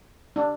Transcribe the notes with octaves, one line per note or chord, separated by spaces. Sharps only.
D4